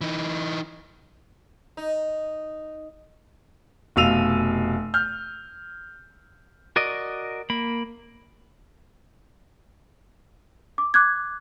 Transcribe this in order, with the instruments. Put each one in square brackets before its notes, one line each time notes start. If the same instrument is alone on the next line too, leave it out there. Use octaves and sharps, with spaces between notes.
[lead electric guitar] E3 D#4
[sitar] D#4
[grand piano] F1 B2 F5 E6 D#7 F7
F6 G6
[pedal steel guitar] F#4 A#4 D5 D#5
A#3 B5
[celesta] D6
D6 F#6 G#6